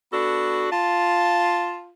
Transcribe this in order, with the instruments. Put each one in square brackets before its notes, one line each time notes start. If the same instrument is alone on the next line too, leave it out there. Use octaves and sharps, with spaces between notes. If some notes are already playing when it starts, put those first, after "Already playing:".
[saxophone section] B3 D4 A4 [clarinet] F#4
[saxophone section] F4 [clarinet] A5